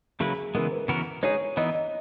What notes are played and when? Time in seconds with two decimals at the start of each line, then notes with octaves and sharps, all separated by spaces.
0.20 C#3 F#3 A#3 E4 G#4 B4
0.55 C#3 E3 G#3 B3 A#4
0.72 B4
0.88 C#3 E3 B3 F#4 A#4
1.23 G#3 D#4 G#4 C#5
1.57 E3 B3 D#4 D#5
1.74 D#5